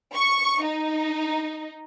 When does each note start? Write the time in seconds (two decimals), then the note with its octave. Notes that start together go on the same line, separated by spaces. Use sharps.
0.14 C#6
0.64 D#4